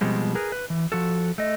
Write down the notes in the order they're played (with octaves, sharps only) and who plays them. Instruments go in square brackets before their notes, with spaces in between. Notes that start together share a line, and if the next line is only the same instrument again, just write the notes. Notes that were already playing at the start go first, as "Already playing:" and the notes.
[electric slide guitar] B2 F3 G3 G#3 C4
G#4 A#4 B4
B4
E3
F3 F#4 A4
A3 D#5